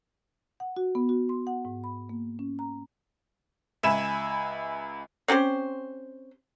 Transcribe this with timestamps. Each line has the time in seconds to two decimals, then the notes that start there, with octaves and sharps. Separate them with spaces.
0.60 F#5
0.77 F#4
0.95 B3
1.09 F#4
1.29 C6
1.47 F#5
1.65 G#2
1.84 B5
2.09 A#3
2.39 C#4
2.59 A#5
3.83 C#2 E5 G#5 B5 E7
5.28 C4 C#4 G4 C5